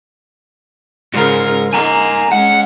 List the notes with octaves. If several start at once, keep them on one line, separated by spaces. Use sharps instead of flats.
G#2 C#3 F4 A#4
A#3 D#4 G#5 A#5
G#3 C#4 F#5